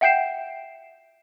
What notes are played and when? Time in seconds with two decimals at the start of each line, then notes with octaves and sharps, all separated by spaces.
0.01 E5 F#5 G5 G6 C7 E7